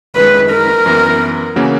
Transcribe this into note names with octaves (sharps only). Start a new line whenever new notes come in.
F#2 D#3 G#3 B4
A#4
F#2 E3 B3
C#3 E3 A#3 C#4 F#4